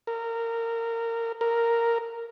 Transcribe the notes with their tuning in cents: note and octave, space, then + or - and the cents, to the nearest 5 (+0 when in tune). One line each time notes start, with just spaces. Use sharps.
A#4 -20
A#4 -5